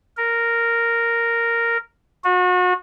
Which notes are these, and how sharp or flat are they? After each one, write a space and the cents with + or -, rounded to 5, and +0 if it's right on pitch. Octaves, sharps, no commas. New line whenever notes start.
A#4 -5
F#4 -35